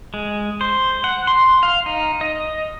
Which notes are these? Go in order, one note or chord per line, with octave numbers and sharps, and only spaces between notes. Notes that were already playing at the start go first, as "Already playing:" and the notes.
G#3
C5
F#5
C6
F5
D#4
D#5